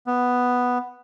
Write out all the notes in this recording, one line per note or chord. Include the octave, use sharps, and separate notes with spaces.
B3